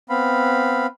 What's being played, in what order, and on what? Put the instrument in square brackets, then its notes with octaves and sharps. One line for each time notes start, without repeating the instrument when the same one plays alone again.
[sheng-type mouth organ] B3 C4 F5 B5